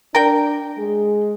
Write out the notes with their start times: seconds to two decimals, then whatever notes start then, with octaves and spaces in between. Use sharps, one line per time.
0.15 D4 A#4 G5
0.77 G#3 G#4